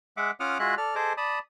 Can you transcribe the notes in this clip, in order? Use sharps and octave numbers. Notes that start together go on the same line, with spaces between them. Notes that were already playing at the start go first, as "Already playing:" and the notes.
G#3 E5 F#5 D6
C#4 F4 F#5 D6 D#6 F6
G#3 F4 F#4 G#4 E5 F#6
A4 D5 F6
G#4 A4 C5 D#5 D6
D5 A5 B5 D#6